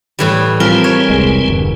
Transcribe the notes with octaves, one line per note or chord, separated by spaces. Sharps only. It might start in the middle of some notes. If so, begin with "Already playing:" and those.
A2 E3 G3
F3 G3 C4 A#4 G#5
C#5
E1 C2 G#3
E1 G2 D3